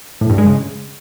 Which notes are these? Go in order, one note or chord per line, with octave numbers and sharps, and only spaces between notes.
A2
G2
G#3
C#3